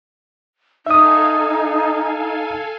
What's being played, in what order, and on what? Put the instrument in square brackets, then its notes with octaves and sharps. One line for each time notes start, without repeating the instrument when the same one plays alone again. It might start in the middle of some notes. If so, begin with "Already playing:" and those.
[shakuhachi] D#4 [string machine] A4 F5 G#5 [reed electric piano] E5 D#6